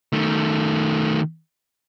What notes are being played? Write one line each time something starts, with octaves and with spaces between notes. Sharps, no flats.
D#3 A3